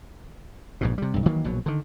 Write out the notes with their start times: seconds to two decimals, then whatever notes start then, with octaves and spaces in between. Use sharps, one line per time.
0.81 A#1 G#2 B2
0.98 C3 G3
1.14 B1 G2
1.26 D#3 E3 F#3 A#3
1.44 A#1 B2 F#3
1.66 D3 D#3